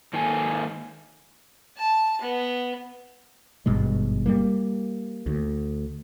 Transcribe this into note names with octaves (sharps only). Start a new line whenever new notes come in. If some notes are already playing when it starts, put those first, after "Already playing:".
G#2 D#3 A#3 A4 G#5
A5
B3
G#1 G2 B2 G#3
G3 A3 A#3
D2